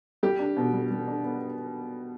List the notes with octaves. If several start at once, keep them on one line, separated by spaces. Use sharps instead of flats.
G3 G4
D4
B2
G3
G3
D4
B3